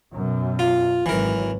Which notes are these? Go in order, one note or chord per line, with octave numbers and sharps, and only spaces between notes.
F#2 B2
F4
G#1 E3 F#3 A#4